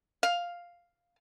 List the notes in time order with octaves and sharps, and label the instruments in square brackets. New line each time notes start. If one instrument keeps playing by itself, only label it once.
[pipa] F5